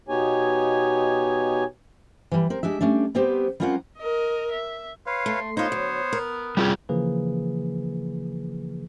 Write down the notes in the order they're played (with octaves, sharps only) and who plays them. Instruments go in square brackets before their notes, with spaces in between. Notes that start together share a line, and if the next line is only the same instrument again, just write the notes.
[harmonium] B2 B3 D#4 G4 C#5 G#5
[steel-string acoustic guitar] E3 G3
C4 A#4
G#3 D4 G4 E5
G3 A3 C#4 D4
G3 B3 C4 G4 C5
G3 C4 C#4 F4 A#4 F#5
[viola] A#4 D#5
E5
[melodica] B4 C#5 F5 [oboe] C6
[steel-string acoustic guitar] A3
[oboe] B3 [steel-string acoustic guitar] D#4 F4 [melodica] C5 C#5
[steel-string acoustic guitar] D2 F#3
A#4
[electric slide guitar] G3 F4 G#4 [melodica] G5 B5
[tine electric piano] C#3 E3 F3 A#3 G#4 B4